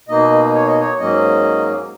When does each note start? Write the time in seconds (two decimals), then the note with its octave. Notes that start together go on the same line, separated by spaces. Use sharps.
0.08 B2 A#3 D#4 D#5
0.54 C#5
0.67 D#5
0.80 C#5
0.99 G#2 F#3 A#3 C#4 D#5